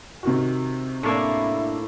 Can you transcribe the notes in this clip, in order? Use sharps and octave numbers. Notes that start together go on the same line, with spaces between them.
C3 D#3 F#4
A2 A#3 D4 E4